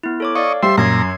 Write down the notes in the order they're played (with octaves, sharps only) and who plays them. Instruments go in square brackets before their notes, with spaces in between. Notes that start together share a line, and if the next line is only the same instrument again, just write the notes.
[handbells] B3 E4
A4 C#5 D6
[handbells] D5 F5 [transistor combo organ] D#5 C#6
[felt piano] G3 [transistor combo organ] C5 E5 C6
[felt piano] F#2 [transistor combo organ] A#2 A#5 [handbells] C6 G#6 C7